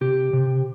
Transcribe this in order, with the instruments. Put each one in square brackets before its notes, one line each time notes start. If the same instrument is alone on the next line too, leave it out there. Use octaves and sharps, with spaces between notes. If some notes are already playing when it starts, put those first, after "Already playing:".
[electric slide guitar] C3 G4
C3